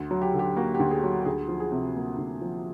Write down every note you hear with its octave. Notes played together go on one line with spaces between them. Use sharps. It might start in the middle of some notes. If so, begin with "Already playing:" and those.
Already playing: D2
F#3
G4
D3
G4
A#3 F#4
G4
D2
G#4
F#3
G4
D2 G#4
F3
G#4
C3
A#3
D2
F3